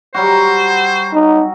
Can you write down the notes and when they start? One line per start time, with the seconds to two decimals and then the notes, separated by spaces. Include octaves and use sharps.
0.14 F#3 G3 F#4 C5
1.14 D#4